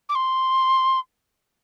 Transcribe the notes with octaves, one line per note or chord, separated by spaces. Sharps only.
D6
C6